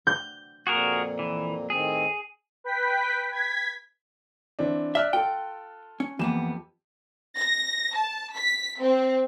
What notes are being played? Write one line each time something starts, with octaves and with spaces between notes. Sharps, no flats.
G6
F2 A#2 A#3 F#4 G#4 A#4
E3
A2 D#3 C4 G#4
B4 G5 B6
G#6 B6
E3 C4 D4
D5 E5 F6 F#6
F4 A4 G5
C#4
F2 E3 A#3 B3 G4 E7
A#6
A5
B6
C4